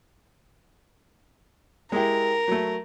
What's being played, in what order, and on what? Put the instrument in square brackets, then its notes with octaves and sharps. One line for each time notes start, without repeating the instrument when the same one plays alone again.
[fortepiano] G#3 E4 G4 [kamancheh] A#4
[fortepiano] F#3 A3